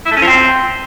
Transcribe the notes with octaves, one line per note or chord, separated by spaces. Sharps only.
E4
A3
C#4
F3
C4